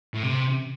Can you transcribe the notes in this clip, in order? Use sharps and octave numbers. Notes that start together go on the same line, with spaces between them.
A2
C3